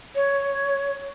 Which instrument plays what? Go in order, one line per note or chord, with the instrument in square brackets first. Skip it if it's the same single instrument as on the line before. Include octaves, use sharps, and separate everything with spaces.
[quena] C#5